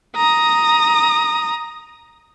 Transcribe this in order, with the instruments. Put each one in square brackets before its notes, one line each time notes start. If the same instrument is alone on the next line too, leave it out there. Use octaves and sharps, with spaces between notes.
[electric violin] A#5 D#6